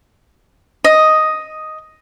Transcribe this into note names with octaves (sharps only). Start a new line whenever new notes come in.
D#5